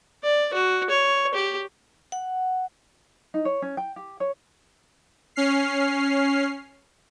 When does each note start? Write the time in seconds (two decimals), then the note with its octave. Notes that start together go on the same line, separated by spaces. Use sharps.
0.23 D5
0.53 F#4
0.90 C#5
1.34 G4
2.12 F#5
3.34 D#4
3.45 C#5
3.62 C#4
3.77 G5
3.96 G4
4.20 C#5
5.36 C#4 F6 C7